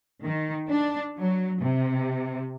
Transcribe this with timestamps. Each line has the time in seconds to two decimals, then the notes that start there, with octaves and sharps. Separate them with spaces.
0.23 D#3
0.69 D4
1.19 F#3
1.61 C3